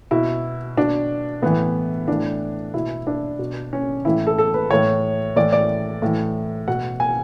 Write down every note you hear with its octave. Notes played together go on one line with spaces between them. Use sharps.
B2 E4
B2 D4
A2 E3 B3
A2 E3 D4
B2 E4
D4
B2
C#4
A2 E3 E4
A4
A4
B4
A2 E3 C#5
A2 E3 D5
D5
A2 E3
B2 F#5
G#5